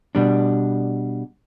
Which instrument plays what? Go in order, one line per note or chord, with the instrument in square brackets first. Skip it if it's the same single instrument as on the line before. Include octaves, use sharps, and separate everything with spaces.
[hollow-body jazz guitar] B2 G3 D4